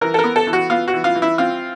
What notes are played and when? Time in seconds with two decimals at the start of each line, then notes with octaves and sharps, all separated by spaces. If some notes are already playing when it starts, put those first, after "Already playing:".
0.01 E3 A#4
0.14 A4
0.19 A#4
0.24 B3
0.36 A4
0.47 E3
0.53 F#4
0.70 B3 F4
0.88 F#4
0.93 E3
1.04 F4
1.15 E3
1.22 E4
1.38 C4 F4